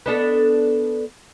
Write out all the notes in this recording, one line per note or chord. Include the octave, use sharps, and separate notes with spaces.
B3 D4 A4